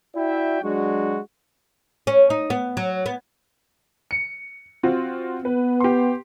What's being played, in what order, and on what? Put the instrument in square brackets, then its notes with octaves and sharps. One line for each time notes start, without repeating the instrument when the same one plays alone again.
[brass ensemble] E4 F#4 D5 E5 G5
F#3 G#3 D4 F#4
[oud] C#4
D#4
B3
F#3
B3
[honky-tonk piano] C#7
C4 F4 F#4
[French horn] B3 [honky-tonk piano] B4
[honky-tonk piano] G4 C6